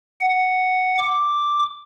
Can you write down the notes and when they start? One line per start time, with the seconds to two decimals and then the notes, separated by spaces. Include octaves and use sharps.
0.21 F#5
0.98 D6